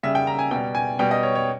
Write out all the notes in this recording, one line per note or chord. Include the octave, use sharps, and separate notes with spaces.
C#3 G3 E5
G5
A#5
G#5
B2 G3 G5
G#5
B2 G3 G5
D#5
C#5
C#5